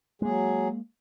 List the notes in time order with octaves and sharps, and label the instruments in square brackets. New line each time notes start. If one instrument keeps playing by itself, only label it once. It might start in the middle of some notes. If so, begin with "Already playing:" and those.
[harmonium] F#3 G#4 [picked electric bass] G#3 A#3